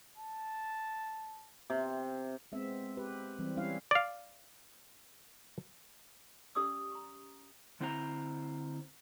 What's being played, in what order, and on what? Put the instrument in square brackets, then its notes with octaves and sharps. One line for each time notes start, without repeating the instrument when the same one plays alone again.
[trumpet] A5
[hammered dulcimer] C3
[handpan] G#3 B3 C4 E5
G4 B4
E3 G3 C4
G3 C#4 E4 C#5 F5
[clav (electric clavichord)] D5 F5
[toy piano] C#4 G4 D5 C#6 D#6 E6
A#5 C#6
[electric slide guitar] D3 C4 E4 C5 D#5 A#5